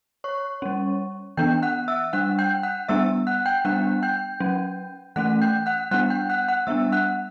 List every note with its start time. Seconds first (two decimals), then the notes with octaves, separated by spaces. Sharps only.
0.24 C#5 C#6
0.62 G3 C#4
1.37 E3 B3 D4 G5 G6
1.63 F#5 F#6
1.88 E5 E6
2.13 G3 D4 F#5 F#6
2.39 G5 G6
2.63 F#5 F#6
2.89 G3 B3 D4 E5 E6
3.27 F#5 F#6
3.46 G5 G6
3.65 G3 B3 D4 F#5 F#6
4.03 G5 G6
4.40 F#3 C#4
5.16 E3 A3 C#4 F#5 F#6
5.41 G5 G6
5.66 F#5 F#6
5.91 G3 B3 D4 F#5 F#6
6.10 G5 G6
6.30 F#5 F#6
6.48 F#5 F#6
6.67 G3 B3 D4 E5 E6
6.92 F#5 F#6